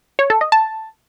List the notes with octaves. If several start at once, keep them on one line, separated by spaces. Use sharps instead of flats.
C#5
A4
D#5
A5